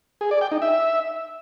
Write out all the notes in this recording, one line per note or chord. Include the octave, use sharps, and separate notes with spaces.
G#4
D5
G5
D#4
E5